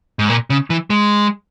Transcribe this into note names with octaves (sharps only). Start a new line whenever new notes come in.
G#2
A#2
C#3
E3
G#3